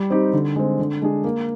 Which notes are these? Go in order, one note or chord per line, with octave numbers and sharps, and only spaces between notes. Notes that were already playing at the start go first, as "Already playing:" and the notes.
Already playing: G3
C4 D#4 G4
D3
G#3 C4
D3
G#3 D4 G#4
A#3